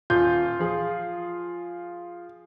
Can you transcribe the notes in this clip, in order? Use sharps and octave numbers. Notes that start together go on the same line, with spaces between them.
D#1 F4 G6
F3 G#4